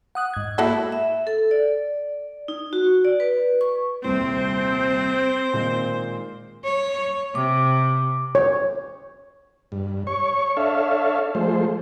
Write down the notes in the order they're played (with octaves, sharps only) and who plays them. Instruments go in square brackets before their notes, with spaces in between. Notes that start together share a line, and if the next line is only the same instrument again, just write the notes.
[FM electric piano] F#5 D#6 F#6
G#2 G#6
[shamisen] A#3 F#4 A4 [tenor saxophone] E4
[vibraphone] E5
A4
D5
D#4
F#4
D5
B4
C#6
[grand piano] D#1 C2 [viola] C4 [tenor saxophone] C5
[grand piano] A#2 D#3 G#3
[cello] C#5
[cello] C3 [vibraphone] D6
[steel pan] C#5
[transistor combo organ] G2
C#5 C#6
D4 A4 C#5 E5 F5
F3 G#3 A3 C5